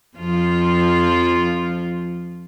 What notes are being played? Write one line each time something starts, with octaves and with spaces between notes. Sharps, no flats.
F2 F3 F4